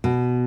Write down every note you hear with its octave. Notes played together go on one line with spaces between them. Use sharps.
B2